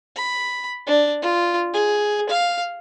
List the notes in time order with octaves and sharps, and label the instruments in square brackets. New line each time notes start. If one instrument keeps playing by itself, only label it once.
[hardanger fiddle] B5
D4
F4
G#4
F5